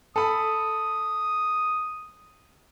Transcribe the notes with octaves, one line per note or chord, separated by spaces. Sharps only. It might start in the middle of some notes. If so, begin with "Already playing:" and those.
A4 B5 D#6